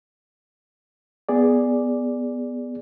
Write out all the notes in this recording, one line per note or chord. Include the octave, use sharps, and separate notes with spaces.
B3 G#4 D5